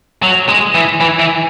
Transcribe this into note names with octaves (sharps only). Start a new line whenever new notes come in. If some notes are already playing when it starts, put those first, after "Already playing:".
F#3
G#3
E3
E3
E3